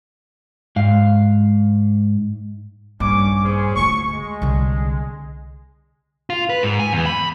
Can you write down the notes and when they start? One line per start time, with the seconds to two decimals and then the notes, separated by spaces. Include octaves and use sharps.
0.76 G#2 F5
3.00 A#1 G2 C#4 D6
3.41 C#4 G#4 C5
3.75 D2 F4 C#6
4.11 G#3
4.42 C2 D3
6.30 F4
6.49 B4
6.63 G#2
6.79 G#5
6.93 E2
7.06 B5